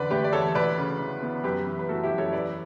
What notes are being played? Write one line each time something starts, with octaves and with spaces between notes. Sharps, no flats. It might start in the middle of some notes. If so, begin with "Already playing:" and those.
Already playing: E2 D3 B4 D5
A3 G4 B4
D5
E2 A4 C#5
D2 B4 D5
C#3
E3
B3
F#2 G4 B4
E3
B4
A3 F#4 A4
E4 G4
F#2
A4 C#5
E2 B4 D5